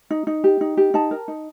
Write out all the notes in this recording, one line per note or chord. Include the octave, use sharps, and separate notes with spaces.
D#4
D#4
G4
D#4
G4
D#4 A5
A#4
D#4